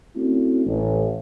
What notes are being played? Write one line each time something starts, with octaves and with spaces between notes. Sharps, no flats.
A3 C4 C#4 E4 F#4
A1